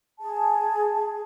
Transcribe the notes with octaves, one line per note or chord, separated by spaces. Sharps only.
G#4 A5